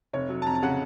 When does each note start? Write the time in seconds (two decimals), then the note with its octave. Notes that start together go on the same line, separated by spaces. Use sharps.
0.13 F1 C#5
0.29 F#3
0.42 A5
0.46 F2 A#5
0.55 A5
0.62 C#3 F#5